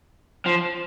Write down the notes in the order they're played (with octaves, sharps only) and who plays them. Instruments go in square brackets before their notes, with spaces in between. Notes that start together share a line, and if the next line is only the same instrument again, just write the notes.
[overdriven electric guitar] F3